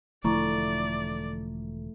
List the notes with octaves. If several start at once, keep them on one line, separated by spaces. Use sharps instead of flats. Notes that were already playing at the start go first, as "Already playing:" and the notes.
E1 D3 F3 A3 E4 D5 A#5 C#6